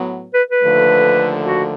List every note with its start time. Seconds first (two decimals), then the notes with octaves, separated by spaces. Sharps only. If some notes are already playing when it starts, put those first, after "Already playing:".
Already playing: A2 F#3 B3
0.34 B4
0.51 B4
0.62 D#2 D3 F3 A3
1.45 F#4